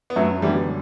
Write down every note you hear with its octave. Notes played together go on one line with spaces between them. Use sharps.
B3
F#2 F#3 A3
D3 E3 F#3 G3 B3